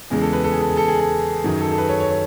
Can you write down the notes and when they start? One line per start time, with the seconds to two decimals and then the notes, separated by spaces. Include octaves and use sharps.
0.10 E2 C#3 G#3 G#4
0.22 A4
0.33 B4
0.44 A4
0.52 G#4
0.61 A4
0.69 G#4
0.77 A4
0.88 G#4
1.00 A4
1.44 F#2 D#3 F#3 G#4
1.61 A4
1.72 A4
1.78 B4
1.89 C#5
2.00 C#5
2.11 C#5